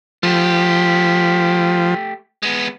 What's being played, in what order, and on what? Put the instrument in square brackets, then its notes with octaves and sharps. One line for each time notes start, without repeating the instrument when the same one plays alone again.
[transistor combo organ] F3 [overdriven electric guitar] A3 G4
[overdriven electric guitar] G#3 B3